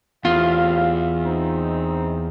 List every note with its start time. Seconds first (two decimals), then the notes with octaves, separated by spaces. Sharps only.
0.25 E2 A2 C3 F4 F5
1.24 C4 D#4